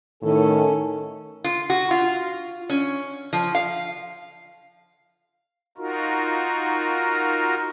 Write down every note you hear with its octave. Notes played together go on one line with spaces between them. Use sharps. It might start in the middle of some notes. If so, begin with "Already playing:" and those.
A2 D#3 C#4 A4
F4
F#4
F4
C#4
F3
F5
D#4 F4 F#4 A#4